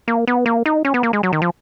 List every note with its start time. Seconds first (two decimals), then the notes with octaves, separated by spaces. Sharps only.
0.08 A#3
0.27 B3
0.46 A#3
0.66 D#4
0.85 C#4
0.94 B3
1.03 A#3
1.13 G#3
1.23 F#3
1.33 D#3
1.42 F3